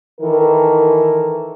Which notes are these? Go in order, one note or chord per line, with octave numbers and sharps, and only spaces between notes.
D#3 E3 A4 A#4